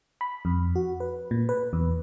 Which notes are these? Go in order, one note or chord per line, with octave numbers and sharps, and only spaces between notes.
B5
F2
F#4
B4
A#2
B4
E2